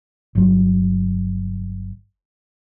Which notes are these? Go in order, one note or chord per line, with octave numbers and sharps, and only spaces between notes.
G1 F#3